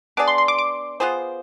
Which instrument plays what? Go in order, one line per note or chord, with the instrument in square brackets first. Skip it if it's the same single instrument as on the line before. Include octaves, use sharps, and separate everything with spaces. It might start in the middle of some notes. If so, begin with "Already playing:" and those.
[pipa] B3 D4 G#4 D5 [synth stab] D6
[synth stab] C6
C6
D6
D6
[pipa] B3 F4 G#4 C5